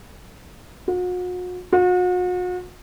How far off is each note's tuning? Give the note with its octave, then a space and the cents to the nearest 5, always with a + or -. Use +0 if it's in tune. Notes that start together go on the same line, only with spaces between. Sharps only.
F#4 -40
F#4 -40